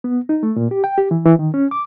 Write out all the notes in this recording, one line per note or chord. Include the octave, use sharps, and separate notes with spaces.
B3
D#4
A3
A#2
G4
G5
G4
E3
E3
D#3
C#4
D6